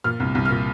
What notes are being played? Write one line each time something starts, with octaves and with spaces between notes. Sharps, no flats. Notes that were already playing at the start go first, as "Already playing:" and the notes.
A#2 F6
C2
C2
A#2 F6